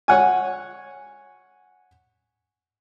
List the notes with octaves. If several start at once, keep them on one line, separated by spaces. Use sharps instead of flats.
C#5 F#5 G#5